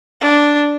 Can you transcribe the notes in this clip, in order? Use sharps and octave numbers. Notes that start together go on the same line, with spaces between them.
D4